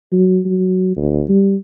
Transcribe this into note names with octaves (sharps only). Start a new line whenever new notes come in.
F#3
F#3
D2
G3